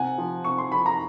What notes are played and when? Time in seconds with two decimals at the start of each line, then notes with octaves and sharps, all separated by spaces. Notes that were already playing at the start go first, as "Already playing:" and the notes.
Already playing: C3 F#5 G#5
0.18 F3
0.44 C3 C#6
0.58 C6
0.72 F3 B5
0.86 A#5